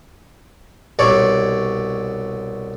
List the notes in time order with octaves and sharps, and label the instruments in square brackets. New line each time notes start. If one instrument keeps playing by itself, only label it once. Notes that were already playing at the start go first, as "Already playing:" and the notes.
[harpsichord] C2 B2 C#5 D5